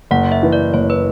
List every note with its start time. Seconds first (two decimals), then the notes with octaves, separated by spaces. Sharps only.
0.11 F#1 F#5
0.32 E5
0.43 E3
0.53 D5
0.74 F#1 C#5
0.90 B4